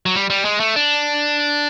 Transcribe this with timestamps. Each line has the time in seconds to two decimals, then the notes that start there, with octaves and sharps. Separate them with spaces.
0.06 F#3
0.15 G3
0.30 G3
0.45 G#3
0.60 A3
0.76 D4